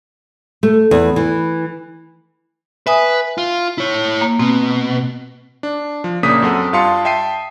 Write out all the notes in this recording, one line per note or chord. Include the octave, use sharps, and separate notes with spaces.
A3
E2
E3
B4 E5 G#5 D#6
F4
E4 C#5
A#3
B2 C4
D4
F3
A#1 C#3 A#3 D4 D#6 B6
F#2 C4 A4 F#5
G2 F4 F5 A5 C6 C#7
E5 G5 A5 C7 D#7